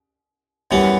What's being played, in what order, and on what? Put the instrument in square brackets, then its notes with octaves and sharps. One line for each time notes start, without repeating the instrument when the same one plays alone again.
[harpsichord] F#2 E3 B3 [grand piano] G3